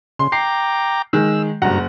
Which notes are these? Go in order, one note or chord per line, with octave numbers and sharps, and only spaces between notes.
C#3 C6
G5 A#5 D6 C7
D#3 G#3 E6
F#1 G2 F#4 F#5 A#5